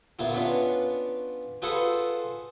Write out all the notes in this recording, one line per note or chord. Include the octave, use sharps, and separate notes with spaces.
A#2 B3 E4 F4
B3 C#4 D4 F4 B4
F4 G#4 A4 B4 C5 F#5